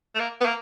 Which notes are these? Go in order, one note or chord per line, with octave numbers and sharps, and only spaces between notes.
A3
A#3
B3
A#3